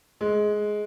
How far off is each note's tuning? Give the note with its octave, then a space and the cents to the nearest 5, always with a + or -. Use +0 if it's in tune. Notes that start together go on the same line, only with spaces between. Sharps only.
G#3 +10